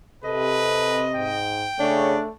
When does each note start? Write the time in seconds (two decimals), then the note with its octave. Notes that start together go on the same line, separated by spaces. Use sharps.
0.24 C3 A4 B4 D#5
1.15 G#2 G5
1.80 C#3 A3 D4 C#5